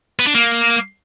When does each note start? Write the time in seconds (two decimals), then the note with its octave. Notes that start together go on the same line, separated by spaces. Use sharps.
0.19 B3
0.27 D4
0.34 A#3